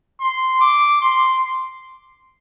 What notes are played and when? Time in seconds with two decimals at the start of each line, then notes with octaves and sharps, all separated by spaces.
0.20 C6
0.61 D6
1.01 C6